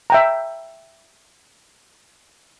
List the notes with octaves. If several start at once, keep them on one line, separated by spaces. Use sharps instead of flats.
E5 G5 A#5